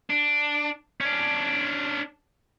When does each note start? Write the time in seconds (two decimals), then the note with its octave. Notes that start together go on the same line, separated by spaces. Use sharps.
0.10 D4
1.01 C#4 D4